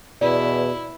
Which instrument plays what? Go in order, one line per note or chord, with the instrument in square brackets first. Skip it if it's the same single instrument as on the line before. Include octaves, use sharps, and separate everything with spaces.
[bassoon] E2 [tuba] B2 [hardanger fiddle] E4 [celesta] D5